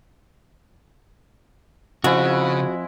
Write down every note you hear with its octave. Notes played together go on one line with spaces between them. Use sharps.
F2 C#3 G#3 E4 F#4